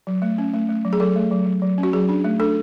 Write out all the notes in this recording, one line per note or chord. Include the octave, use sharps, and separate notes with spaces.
F#3
A3
C#4
A3
A3
F#3
G#4
F#3 A4
A3
F#3
F#3
F#3
C#4
F#4
F#3 G#4
D4
A3
D4 A4